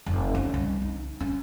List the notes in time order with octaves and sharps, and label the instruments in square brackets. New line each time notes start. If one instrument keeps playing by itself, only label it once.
[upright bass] F1
C#4
C2
D#4
C#4